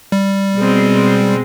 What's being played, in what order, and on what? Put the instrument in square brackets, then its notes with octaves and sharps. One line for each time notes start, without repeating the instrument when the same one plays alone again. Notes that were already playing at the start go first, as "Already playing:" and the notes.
[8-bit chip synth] G3
[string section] B2 G#3 C4